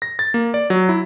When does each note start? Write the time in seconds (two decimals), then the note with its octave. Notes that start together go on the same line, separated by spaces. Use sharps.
0.02 A#6
0.19 A6
0.34 A#3
0.54 D5
0.70 F#3
0.89 E4